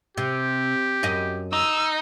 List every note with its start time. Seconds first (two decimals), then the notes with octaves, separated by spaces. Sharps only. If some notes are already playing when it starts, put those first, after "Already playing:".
0.17 C3 G4
1.03 F#2 D#5
1.53 D#4 E6